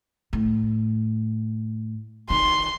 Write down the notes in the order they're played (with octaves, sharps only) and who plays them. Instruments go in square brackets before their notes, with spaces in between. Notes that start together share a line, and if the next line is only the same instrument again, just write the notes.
[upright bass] A2
[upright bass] D#3 [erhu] C6